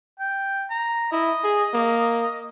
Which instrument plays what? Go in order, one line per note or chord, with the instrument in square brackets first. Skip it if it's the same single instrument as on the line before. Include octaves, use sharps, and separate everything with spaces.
[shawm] G5
A#5
[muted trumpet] E4 [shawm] D#5
[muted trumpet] G#4
A#3